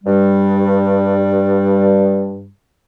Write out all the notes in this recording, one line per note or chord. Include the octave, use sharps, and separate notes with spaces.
G2 G3